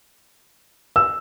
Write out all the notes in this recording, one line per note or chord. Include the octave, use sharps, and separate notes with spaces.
E6